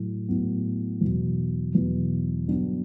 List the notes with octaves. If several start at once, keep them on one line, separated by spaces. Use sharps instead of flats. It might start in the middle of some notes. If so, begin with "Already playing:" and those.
Already playing: A2 F#3
A2 F#3 B3
E2 B2 F#3
E2 B2 F#3
G2 D3 F#3 B3 D4